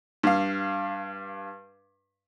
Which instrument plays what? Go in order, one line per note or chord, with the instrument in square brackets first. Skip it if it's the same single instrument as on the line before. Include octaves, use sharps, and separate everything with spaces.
[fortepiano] G2 F5